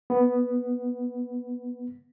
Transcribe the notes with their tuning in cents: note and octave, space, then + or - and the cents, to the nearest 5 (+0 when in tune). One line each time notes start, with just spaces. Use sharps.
B3 +0